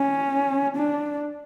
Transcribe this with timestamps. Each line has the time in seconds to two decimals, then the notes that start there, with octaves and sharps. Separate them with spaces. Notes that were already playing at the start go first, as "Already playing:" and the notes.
Already playing: C#4
0.76 D4